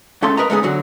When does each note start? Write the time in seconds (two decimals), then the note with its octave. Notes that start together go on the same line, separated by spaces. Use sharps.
0.22 C#2 C#3 A3 C#4 A4 C6
0.37 A#4 B4 D#5 A#5
0.50 G#3 A3 B3 C#4 D#4 G#4
0.63 D3 F#3 F#4